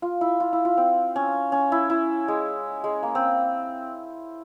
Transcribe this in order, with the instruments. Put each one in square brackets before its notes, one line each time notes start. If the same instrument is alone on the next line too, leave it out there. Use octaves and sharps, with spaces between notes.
[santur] F4
E4
F4
E4
F4
C4
C#4
C#4
E4
E4
G#3
G#3
A#3
C4